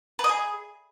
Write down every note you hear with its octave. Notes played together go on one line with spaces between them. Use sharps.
B4
D#5
G#4